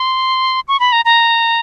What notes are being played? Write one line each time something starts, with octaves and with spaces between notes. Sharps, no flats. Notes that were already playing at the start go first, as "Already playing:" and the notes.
Already playing: C6
C#6
B5
A#5
A#5